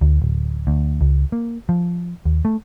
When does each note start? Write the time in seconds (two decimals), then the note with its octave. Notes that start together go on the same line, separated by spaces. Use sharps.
0.01 D2
0.22 D1
0.67 D2
1.01 C#2
1.32 A#3
1.69 F3
2.25 D#2
2.45 A3